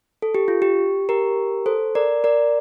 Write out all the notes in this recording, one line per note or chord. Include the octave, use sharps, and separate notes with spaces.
A4
G4
F4
G4
G4 A#4
A4 C5
A#4 D5
A#4 D5